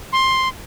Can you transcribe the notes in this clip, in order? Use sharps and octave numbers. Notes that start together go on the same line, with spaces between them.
C6